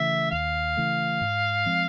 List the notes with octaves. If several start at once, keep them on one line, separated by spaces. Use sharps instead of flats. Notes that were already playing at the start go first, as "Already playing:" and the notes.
Already playing: C#3 E3 A3 E5
D#2 F5
C#3 E3 A3
G#2
F3 G#3 C4